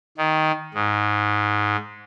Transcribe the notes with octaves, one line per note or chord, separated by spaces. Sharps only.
D#3
G#2